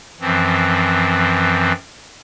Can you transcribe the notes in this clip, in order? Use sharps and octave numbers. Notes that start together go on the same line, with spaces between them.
F#2 E3 F3 C4